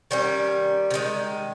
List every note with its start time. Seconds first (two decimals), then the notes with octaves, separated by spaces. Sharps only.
0.11 D#3 G3 C#4
0.91 C3
0.94 D#3 G#3